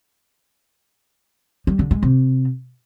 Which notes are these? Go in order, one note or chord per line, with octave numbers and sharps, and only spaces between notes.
G3
D3
G#3
C3